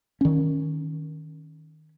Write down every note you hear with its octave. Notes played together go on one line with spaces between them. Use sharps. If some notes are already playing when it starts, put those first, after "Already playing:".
D#3 C#4